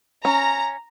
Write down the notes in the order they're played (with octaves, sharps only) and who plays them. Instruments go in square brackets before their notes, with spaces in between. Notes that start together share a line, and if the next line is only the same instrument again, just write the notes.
[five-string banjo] C#4 [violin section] A#5